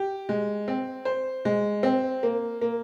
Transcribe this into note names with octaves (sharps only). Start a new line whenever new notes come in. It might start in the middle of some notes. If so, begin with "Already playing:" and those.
Already playing: G4
G#3
C4
C5
G#3
C4
A#3
A#3